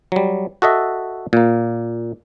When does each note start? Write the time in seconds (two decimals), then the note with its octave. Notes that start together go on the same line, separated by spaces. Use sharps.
0.12 F#3 G3
0.62 F#4 A4 D#5 E5
1.33 A#2 A#3